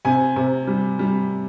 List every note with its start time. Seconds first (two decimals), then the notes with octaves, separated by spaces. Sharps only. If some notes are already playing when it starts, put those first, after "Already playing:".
0.05 C3 G#5
0.36 C3
0.67 G3
0.99 G3